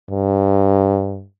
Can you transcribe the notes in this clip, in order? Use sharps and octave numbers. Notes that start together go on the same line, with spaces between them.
G2